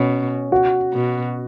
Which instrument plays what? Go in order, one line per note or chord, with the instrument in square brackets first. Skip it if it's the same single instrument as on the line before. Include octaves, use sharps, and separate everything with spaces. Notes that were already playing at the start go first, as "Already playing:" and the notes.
Already playing: [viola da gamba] B2 [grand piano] C#4
[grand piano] F#4
[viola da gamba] B2